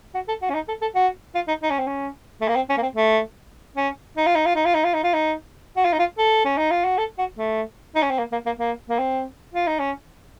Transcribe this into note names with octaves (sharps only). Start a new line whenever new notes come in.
F#4
A4
F#4
C#4
D#4
A4
A4
F#4
F4
D#4
D#4
C#4
C4
C#4
A3
A#3
C4
C#4
A#3
C4
A3
C#4
D#4
F4
D#4
F4
D#4
F4
D#4
F4
D#4
F4
D#4
F#4
F4
D#4
F4
A4
C#4
D#4
F4
F#4
A4
F#4
A3
D#4
C#4
C4
A#3
A#3
A#3
A#3
A#3
C4
F4
D#4
C#4